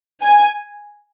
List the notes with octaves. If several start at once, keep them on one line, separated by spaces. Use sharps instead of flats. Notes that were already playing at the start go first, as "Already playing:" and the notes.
G#5